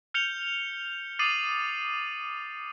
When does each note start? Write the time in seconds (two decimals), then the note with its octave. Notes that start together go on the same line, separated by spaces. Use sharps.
0.14 F6 G6 C#7 F7 G7
1.19 D6 D#6 A6 C7 D#7 F#7